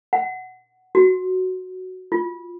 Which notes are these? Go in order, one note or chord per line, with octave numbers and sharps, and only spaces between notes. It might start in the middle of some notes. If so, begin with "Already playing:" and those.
F#5
F#4
F4